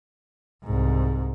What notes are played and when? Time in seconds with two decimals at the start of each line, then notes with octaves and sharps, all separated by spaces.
0.64 C2 G#2